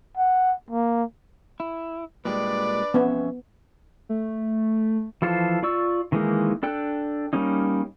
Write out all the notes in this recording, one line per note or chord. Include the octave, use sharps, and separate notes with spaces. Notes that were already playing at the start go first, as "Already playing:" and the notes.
F#5
A#3
E4
A#2 G3 G#3 D4 B4 D5
F2 B3 C#4 E5
A3
E3 F3 F4 A4 C5
F4 D5 C#6 E6
D#3 E3 G#3 A#3 D#4
D4 A4 G5 F#6
G3 A#3 C#4 D#4